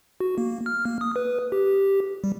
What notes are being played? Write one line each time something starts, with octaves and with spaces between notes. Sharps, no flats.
F#4
A#3
F6
A#3
D#6
B4
G4
G3